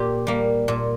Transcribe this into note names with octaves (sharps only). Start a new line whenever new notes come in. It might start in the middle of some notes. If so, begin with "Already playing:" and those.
Already playing: A#2 G4
G3 A#3
A#2